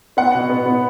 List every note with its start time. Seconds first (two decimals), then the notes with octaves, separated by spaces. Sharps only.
0.17 B3 F#5
0.34 B2
0.50 B3
0.66 B3